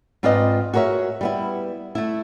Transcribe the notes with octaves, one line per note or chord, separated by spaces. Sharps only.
G#2 C4 F4 B4 D5 D#5
F#4 G#4 A#4 C#5 E5
G3 B3 E4
A3 E4